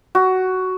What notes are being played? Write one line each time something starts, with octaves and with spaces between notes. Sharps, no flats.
F#4